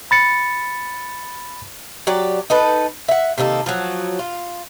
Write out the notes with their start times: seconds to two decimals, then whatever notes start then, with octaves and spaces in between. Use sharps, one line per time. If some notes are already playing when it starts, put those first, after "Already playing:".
0.11 B5 A6 C#7
2.07 F#3 G4 D5
2.50 D#4 A4 B4
3.08 E5 F#5
3.38 C3 D#3 A#3 A4
3.66 F3 F#3
4.19 F4